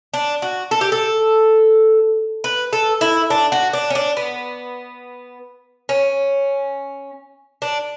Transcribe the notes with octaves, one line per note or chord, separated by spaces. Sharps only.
D4
F#4
A4
G4
A4
B4
A4
E4
D4
F#4
D4
C#4
D4
B3
C#4
D4